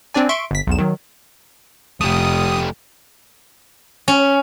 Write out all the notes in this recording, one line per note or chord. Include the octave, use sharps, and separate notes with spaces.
C4 D4 D5 G#5
E5 C6 C#6 D7
G1 B6
B1 E2 E7
D#3 F#3
F1 A3 G4 D#6
C#4